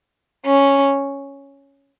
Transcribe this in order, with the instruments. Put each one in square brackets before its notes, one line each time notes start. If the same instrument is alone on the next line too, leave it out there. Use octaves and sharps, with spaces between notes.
[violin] C#4